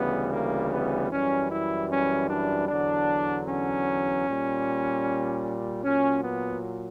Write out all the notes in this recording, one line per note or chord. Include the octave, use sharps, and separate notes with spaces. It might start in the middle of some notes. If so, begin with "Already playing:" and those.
Already playing: D2 C#3 E3 G3 B3
A#3
B3
F#2 E3 G3 C#4
E4
C#4
D4
E2 D3 F#3 D4
C#4
A#2 G3
A#2 F#3 C#4
B3